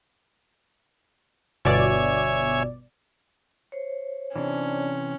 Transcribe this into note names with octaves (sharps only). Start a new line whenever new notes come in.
G1 B2 C#5 D5 E5 G#5
C5 C#5
C3 E3 C#4 D4